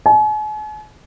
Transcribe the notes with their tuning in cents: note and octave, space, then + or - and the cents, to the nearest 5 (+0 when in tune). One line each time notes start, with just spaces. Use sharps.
G#5 +45